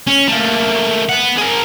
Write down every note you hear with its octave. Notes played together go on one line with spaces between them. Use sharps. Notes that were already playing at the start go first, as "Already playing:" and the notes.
C#4
A3 A#3
B3 F#5
G#4 A#4